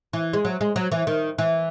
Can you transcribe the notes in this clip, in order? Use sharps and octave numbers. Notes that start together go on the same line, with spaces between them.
E3
G#3
F#3
G#3
F#3
E3
D#3
E3